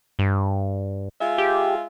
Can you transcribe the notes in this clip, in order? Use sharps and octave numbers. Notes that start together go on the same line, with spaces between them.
G2
G#3 F4 E5
G4